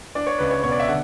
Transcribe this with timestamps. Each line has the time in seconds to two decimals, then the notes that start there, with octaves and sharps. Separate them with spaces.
0.15 D4 D5
0.27 C#5
0.38 C#2 B4
0.50 C#5
0.63 B2 C#5
0.72 D5
0.80 E5
0.88 D3 F#5